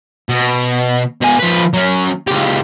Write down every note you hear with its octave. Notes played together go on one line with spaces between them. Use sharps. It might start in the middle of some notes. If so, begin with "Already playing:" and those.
B2
B2 G#5
F3 B4
F#3 C#4
C#2 G4